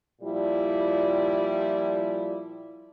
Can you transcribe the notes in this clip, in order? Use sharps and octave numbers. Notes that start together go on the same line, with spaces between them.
A#2 F3 G3 E4